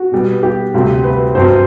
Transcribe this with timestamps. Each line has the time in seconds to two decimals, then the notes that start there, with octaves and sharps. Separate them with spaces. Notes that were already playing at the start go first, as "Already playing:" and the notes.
Already playing: F#4
0.12 B2 G3 B3
0.43 G4
0.74 D2 C3 G3 C4
1.04 B4
1.35 G2 F#3 C4 C5